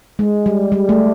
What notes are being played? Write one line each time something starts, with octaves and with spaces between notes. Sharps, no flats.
G#3
G3
G3
A3